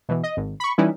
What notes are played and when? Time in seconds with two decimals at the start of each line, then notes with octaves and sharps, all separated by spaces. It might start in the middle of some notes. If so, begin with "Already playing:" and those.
0.09 B2 E3
0.23 D#5
0.37 G#1
0.60 B5 C#6
0.78 E3 G3 C#4 D#4 E4 B4